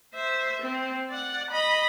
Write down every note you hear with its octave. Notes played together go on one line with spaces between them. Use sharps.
C5 E5
C4
D5 F#5
D#5 B5